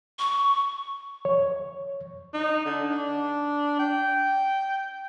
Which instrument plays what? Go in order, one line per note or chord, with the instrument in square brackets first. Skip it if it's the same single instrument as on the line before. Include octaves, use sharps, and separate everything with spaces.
[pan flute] C#6
[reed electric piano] C#5
[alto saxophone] D#4
D3
D4
G5